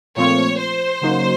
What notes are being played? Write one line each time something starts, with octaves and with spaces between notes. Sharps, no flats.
A#2 F3 A3 C4 F4 C#5
C5
C#3 F#3 A#3 D#4 F#4